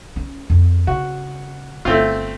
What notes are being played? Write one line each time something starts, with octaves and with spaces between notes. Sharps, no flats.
C#4
F2
C#3 F#4
G1 A3 C4 F4